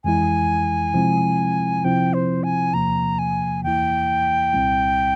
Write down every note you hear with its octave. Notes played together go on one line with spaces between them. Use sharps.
F2 E3 G#3 E4 G#5
C3 F3 G#3 C4 E4
C3 F3 C4 E4 G5
C5
G#5
E2 C3 F3 A#3 A#5
G#5
E2 E3 A#3 E4 G5
C2 A#2 G3 C4 E4